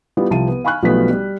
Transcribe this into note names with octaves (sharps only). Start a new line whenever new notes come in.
G3 B3 E4 F4
C2 F3 A5 D#7
B3
F5 G#5 B5 C#6 F6 F#6
B1 F3 G3 A3 B3 B6
G3